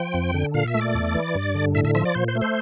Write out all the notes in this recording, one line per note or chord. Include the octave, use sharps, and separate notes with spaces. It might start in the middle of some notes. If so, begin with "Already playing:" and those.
Already playing: F3 G5
F2
D3
A#2 F5
E5
A3
D5
E2
E3
G2
D3
A2 E5
E5
F3 E5
D5
A#2 C5
C5
A3
C5